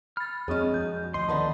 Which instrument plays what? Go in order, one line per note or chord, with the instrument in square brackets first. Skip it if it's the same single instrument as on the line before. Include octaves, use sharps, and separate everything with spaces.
[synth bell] B5 A6 [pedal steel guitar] F6
[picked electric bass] F2 [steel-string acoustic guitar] F#3 G#3 [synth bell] C4 D4 G#4
[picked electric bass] F3 [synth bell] G6
[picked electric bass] D2 F3 [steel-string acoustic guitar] D#5 [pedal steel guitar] C6
[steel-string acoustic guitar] D3 B3 D#4 [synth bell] D#3 A5